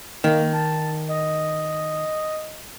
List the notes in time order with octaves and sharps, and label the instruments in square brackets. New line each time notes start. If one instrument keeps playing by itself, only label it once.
[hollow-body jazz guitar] D#3 [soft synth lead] A#3
[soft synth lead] A5
D#5